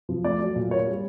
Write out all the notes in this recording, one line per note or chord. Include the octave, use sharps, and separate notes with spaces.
F3
A3 D5
F#3
A#2
A#3 C#5
G3